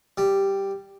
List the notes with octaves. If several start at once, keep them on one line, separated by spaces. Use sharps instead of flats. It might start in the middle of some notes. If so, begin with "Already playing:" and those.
G3